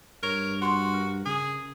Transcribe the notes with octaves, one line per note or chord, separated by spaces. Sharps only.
G2 A#4 C#5
F#4 C6 C#6 F6
A#4
C#3 G#4